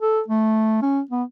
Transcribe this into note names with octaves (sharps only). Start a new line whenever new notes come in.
A4
A3
C#4
B3